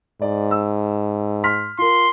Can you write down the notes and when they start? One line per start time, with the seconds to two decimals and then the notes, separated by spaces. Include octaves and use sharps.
0.22 G#2 D5
0.51 E6
1.44 C6 F6 B6
1.79 F4 A#4 C6